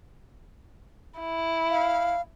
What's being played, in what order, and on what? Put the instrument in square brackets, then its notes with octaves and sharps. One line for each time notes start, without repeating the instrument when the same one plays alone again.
[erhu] E4
[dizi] F5